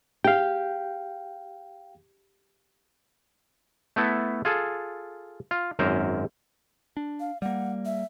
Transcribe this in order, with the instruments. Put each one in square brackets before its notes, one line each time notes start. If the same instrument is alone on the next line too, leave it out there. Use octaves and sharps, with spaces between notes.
[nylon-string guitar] G4 [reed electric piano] F5 G5
[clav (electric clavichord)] A3 B3 E4 A4
F4 G#4 A4
F4
G#1 F#2 A#4 C5
[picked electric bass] D4
[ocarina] F5
[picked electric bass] G3 A#3 [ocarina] F#5
[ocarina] E5